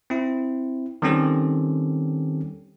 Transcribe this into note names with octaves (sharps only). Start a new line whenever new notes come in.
C4 E4
D#3 G3 C4 C#4 G4 A4